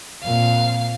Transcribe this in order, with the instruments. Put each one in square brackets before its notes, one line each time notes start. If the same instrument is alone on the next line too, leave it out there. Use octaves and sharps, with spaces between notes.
[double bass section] F2 A#2 [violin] F5